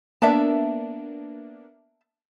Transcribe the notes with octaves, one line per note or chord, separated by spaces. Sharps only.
A#3 B3 D4 E5 A5